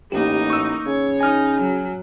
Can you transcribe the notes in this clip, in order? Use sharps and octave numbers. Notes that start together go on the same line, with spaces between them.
A1 A#3 D#4 G4
C#6 E6
C#3 C#5
D#4 G#5 F6
F#3